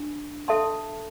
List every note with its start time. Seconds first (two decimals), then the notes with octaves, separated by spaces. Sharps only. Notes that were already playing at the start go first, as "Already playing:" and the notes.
Already playing: D4
0.48 A4 E5 A5 C6